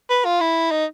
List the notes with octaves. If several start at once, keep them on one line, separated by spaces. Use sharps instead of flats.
B4
F4
E4
D#4